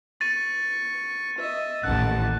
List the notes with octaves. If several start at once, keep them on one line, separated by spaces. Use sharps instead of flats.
C#6 A6 D#7
D#5 E5
A1 D#2 F#5 A5 F#6